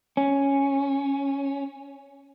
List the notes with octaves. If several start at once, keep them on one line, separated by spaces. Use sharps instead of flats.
C#4